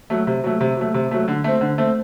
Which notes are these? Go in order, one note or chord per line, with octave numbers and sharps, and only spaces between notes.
F#3 A3
C3
F#3 A3
C3
F#3 A3
C3
F#3 A3
D3
A3 C4
D3
A3 C4